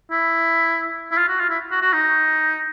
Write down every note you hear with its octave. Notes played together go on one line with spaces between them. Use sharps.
E4
E4
F4
F#4
F4
E4
F#4
F#4
D#4